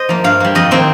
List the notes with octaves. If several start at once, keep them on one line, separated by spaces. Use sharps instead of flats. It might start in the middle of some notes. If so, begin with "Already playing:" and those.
Already playing: C5 D#5
F3 A#3
G2 F5
G3 A#3
F2 D#5
D#3 A#3 C4